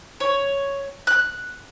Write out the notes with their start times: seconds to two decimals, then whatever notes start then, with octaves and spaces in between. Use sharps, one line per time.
0.20 C#5
1.07 F#6